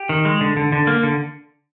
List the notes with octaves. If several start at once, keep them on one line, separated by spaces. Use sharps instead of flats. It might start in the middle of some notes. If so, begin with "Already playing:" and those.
Already playing: G4
D#3
G#3
D3
D3
D3
A#3
D3